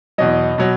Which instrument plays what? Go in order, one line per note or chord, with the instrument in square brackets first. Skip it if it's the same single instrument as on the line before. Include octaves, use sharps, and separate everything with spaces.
[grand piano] E2 B2 F#3 D#5
B2 F#3